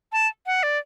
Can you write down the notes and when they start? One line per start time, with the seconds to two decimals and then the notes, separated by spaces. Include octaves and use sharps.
0.12 A5
0.46 F#5
0.63 D5